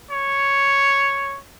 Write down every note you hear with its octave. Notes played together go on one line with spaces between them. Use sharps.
C#5